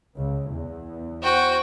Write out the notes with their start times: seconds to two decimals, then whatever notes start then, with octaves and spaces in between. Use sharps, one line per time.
0.18 C#2
0.52 E2
1.23 F#4 C5 G5